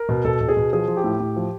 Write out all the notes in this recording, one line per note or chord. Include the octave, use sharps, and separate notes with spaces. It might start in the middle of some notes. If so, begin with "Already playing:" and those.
Already playing: A#4
B2
B2 A4
B2
G#4
B2
F3 G#4
F3
G4
A2
A2
F3